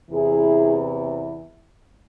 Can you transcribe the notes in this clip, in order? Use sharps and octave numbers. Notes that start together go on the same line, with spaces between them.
E2 C3 E3 E4 G#4